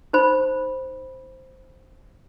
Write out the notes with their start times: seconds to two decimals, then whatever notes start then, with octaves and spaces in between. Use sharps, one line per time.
0.13 D#4 C5 B5